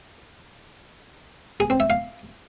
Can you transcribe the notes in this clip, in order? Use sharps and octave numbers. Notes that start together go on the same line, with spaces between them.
G#4
C4
E5
F5